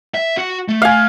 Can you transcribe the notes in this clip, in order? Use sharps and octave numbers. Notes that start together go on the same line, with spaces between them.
E5
F#4
A3
F5 G#5